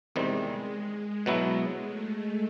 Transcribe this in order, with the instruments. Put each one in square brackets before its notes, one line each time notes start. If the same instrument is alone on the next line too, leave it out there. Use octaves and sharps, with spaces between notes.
[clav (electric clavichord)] E2 C3 D#3 G3 C4 [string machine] G#3
[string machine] G#3
[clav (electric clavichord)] B2 F#3 B3 E4
[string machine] A3